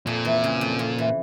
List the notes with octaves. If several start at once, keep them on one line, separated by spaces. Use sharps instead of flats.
F2 A#2
E3
C#3
F2
F2
E3